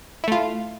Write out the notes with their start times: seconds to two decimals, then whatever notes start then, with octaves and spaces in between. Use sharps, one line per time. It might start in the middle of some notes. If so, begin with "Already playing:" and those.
0.24 E4
0.28 A3
0.32 F4